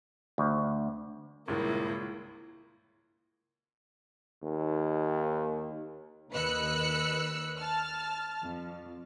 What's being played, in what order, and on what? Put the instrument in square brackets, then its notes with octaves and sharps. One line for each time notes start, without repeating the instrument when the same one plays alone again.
[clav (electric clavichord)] D2
[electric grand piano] G#1 G2 A#2 [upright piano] C#2 [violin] A#3 [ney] E4
[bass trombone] D#2
[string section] D#2 B4 D#5 E6 F#6 C#7
A5 F6
F2